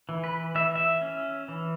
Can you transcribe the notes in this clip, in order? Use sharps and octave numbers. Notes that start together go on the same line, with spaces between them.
E3
B4
E3 E5
E5
C#4
E3